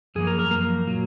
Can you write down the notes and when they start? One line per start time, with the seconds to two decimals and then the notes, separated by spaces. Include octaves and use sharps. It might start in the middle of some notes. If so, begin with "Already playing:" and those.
0.15 F#2 F3 A#3 G#4
0.27 A#4
0.39 A#4
0.51 F#2 F3 A#3 A#4
0.87 A#2 F#3 A#3